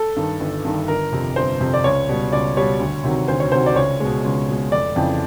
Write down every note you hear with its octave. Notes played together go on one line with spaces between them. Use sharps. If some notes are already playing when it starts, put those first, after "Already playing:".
Already playing: A4
G2 D#3
G1
G2 D#3
G1 A#4
F2 C3
G1 C5
F2 C3
D5
C#2 C#5
B2 G3
C#2 D5
B2 G3 C#5
D2
C3 D#3 F#3
D2 C5
C#5
C3 D#3 F#3 C5
D5
C#2 C#5
B2 G#3
C#2
B2 G#3
F1 D5
F2 C#3 E3 G5